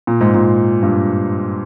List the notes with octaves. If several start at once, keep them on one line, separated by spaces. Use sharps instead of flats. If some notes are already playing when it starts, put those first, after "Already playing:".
A#2
G#2
A#2
G2